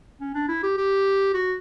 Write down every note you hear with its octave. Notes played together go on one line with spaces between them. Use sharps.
C#4
D4
E4
G4
G4
F#4